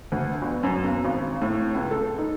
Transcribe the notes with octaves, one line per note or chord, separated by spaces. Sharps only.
D2
G1
F#2
B1
G#1
A2
C#2
A4
D#4